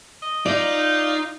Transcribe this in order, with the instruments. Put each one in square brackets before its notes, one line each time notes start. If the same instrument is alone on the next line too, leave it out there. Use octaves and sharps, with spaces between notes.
[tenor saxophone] D#5
[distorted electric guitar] D#4 [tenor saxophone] F4 [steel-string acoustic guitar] D5